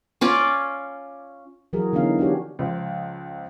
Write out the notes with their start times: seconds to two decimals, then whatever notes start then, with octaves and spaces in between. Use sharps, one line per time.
0.21 C#4 F4 D5
1.73 E3 F#3 F#4 G#4 A#4
1.93 D3 E3 B3 C#4 D#4 F5
2.19 D4 F#4 G4 C#5
2.59 C#2 F3